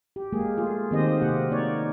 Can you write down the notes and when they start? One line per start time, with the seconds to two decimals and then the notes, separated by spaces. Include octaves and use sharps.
0.16 G4
0.32 G#3 A#3 G#4
0.58 A3 F4 G#4
0.91 D#3 A#3 C4 G4 C5 D#5
1.21 C3 A#3 G4 F#5
1.51 A#3 D#4 C#5 D5